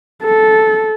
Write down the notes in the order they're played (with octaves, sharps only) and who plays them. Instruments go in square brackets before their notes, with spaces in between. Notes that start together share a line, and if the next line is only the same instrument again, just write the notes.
[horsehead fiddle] A4